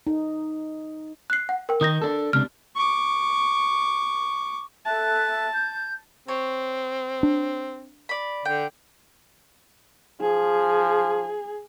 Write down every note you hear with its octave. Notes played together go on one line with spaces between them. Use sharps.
D#4
F#6 C7
F#5
A#4 G5
D#3 D#4 D#6 G6 A#6
D4 A4
C#2 C3 D4 F6
C#6 D6
A4 E5 A5 F#6
G6
C4 C#5
D4
D5 B5
D3 G5
F3 G#4